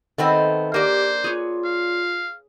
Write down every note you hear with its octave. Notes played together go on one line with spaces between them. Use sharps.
D#3 A3 B3 C4
A#3 D4 G4 C5 D5
F4 G#4 B4 C#5
F5